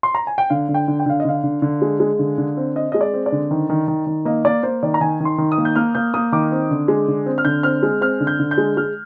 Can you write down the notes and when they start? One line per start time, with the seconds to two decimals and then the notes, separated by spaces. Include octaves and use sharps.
0.03 C6
0.15 A#5
0.27 G#5
0.38 G5
0.50 D3 F5
0.69 D3
0.74 G5
0.88 D3
1.00 G5
1.06 D3 F5
1.20 D#5
1.25 D3 F5
1.44 D3
1.62 D3
1.82 G#3
2.00 G#3
2.19 D3
2.38 D3
2.57 C4
2.75 C4 D#5
2.92 G#3 D#5
3.01 D5
3.14 C4
3.26 D5
3.32 D3
3.51 D#3
3.69 D#3
3.88 D#3
4.06 D#3
4.25 A#3 D#5
4.45 A#3 D5
4.63 A#3 C5
4.83 D#3 D5
4.94 A#5
5.01 D#3 G#5
5.20 D#3
5.25 C6
5.38 D#3
5.52 D#6
5.58 A#3
5.65 G6
5.76 A#3 F6
5.95 A#3 G6
6.14 A#3 D#6
6.32 D#3 D6
6.52 C4
6.71 D3
6.88 G#3
7.08 D3
7.26 C4
7.38 F6
7.45 D3 G6
7.63 C4 F6
7.83 G#3
8.01 C4 F6
8.20 D3
8.27 G6
8.40 D3
8.51 G6
8.58 G#3
8.77 G#3 F6